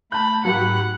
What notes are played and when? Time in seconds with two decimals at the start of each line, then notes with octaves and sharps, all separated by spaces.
0.12 A3 A5 B5 G6
0.45 G#2 F#3 F#4 G4 F#5 B5